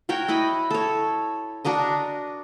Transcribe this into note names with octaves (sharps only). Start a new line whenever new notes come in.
F#4 A#4 C#5 G5
E4 D#5 B5
A4 C#5
D4 F#4 A#4 D#5